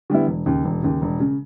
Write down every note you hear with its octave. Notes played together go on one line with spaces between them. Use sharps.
D3 G3 B3 E4
E1
D#2 C#3
E1
D#2 C#3
E1
C#3